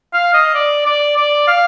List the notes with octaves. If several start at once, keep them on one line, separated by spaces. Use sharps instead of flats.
F5
D#5
D5
D5
D5
F5